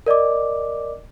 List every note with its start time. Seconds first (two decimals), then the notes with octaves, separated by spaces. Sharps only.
0.06 A#4 D5 D#5 D6